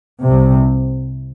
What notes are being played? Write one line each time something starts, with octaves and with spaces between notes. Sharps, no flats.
C2 C3